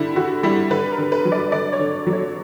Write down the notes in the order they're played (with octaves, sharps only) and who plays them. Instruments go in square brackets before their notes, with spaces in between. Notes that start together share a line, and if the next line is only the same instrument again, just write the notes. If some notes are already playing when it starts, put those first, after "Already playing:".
Already playing: [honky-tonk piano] D3 G3 E4
D3 F#4
G3 E4
D3 B4
A#4
D3
B4
F#3
D5
D3 D5
C#5
D3
F#3
C#5